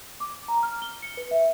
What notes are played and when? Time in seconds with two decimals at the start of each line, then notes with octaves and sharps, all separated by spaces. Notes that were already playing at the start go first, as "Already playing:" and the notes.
0.20 D6
0.48 A#5
0.63 F6
0.82 G7
1.02 C#7
1.17 B4
1.31 E5